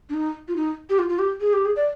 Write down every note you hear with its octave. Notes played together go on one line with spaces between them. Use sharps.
D4
D#4
F4
D#4
G4
F4
F4
G4
G#4
G4
G#4
D5